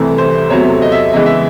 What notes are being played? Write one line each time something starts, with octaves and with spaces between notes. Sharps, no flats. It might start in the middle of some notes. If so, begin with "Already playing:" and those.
Already playing: C2 C3 E3 A3
C5
E2 C3 F#3 A3 C#5
D#5
E5
D#5
E2 C#3 E3 G#3 D#5
E5